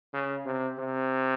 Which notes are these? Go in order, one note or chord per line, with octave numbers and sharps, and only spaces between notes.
C#3
C3
C3